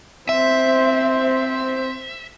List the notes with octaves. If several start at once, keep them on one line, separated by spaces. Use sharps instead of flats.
C4 C5 E5